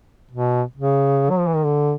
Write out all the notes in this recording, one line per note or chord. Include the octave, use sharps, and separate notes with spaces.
B2
C#3
F#3
F3
E3
D#3
D3